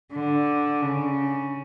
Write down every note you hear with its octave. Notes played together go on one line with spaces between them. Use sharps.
D3
C#3